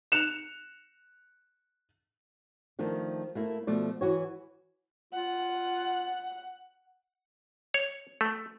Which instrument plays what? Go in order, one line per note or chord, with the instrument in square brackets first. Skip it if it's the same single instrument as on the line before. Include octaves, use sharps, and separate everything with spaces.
[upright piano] F#6 C#7 E7 F7
[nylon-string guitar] D#3 F3 A3 D4
A3 A#3 E4
B2 F3 A3 D5
E3 F#4 C#5
[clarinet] F4 [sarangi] F#5
[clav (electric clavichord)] C#5
A3